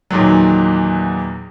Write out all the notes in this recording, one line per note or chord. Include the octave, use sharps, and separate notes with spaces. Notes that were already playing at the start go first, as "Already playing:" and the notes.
E2 A#2 D#3 F#3